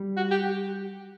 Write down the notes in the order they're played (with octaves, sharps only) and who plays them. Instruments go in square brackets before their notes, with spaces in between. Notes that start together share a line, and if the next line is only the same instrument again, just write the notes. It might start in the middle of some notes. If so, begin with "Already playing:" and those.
Already playing: [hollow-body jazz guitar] G3
[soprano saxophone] F#4
G4